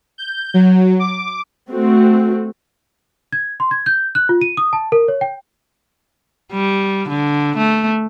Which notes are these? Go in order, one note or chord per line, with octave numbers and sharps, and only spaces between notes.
G6
F#3
D6
A3 C4 F#4
G#6
C6
G#6
G6
F#6
F4
D#7
D#6
A5
A#4
C#5
G5
G3
D3
A3